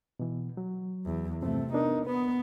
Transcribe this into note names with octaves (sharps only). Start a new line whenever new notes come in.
B2 E3
F#3
E2
G2 C3 F3 A3 C4
B3 D4 D#4 A#4
B3 B4